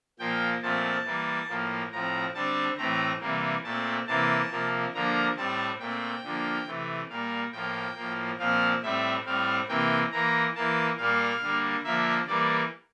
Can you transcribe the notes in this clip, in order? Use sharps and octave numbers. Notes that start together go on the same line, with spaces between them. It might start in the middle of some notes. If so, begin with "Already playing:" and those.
A#2 F3 A#3 G5
A#2 F3 A3 C4 A5
E3 G3 A#3
A2 F3 A#3
A2 F3 C4 A#5
D3 G3 C4 A5
A2 E3 A3 C4 A#5
C3 E3 G3 A#3
A#2 A3 C4 A5
C3 E3 A#3 A5
C3 F3 A#3
D3 F3 A#3 A#5
A2 G3 C4 A5
A#2 A3 C4 G5
D3 F3 A#3
C3 E3 A3
A#2 G3 A#3 F5
A2 F3 A#3 G5
A2 F3 A#3
A#2 F3 C4 F5
A2 G3 C4 E5
A2 G3 C4 F5
C3 E3 A#3 G5
E3 A#3 A#5
E3 A#3 A5
A#2 G3 A#3 F5
D3 G3 A#3
D3 F3 A#3 E5
E3 G3 A#3 D5